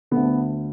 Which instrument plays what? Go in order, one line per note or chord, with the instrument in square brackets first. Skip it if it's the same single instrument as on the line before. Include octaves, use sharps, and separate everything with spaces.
[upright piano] D2 D3 B3